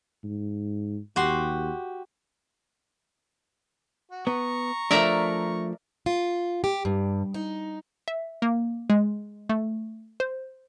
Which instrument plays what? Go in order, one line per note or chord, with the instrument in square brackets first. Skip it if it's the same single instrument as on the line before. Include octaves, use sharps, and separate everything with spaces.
[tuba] G#2
[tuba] D#2 [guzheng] F#4 G4 C6
[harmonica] F#4
[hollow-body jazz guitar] B3 [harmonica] A#5 C#6
[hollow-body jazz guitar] F3 A3 D4 [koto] A#4 D5 E5
[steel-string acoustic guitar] F4
G4
G2
D#4
[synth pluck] E5
A#3
G#3
A3
C5